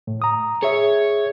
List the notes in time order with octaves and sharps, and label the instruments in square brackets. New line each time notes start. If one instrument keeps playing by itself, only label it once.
[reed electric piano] A2
A#5 D#6
[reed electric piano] G#4 E5 [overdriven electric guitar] C#5